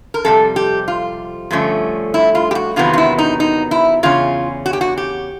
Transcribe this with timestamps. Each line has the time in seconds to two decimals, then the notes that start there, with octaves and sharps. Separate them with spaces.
0.14 A#4
0.24 F2 C3 G3 A4
0.56 G4
0.88 F4
1.51 G2 D3 F3 A3 C#4
2.14 E4
2.35 F4
2.51 G4
2.55 F#4
2.76 E2 C3 D#3 F#3 B3 F4
2.93 F4
2.98 E4
3.19 D#4
3.40 D#4
3.71 E4
4.03 E2 C#3 C#4 F4
4.66 F#4
4.73 G4
4.81 F#4
4.98 G4